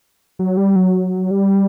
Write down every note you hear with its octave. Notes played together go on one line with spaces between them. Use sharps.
F#3
G3
F#3
G3